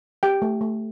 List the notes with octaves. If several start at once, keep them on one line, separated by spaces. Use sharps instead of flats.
G4 G5
A3
A3